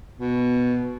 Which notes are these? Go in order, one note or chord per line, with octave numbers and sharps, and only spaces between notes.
B2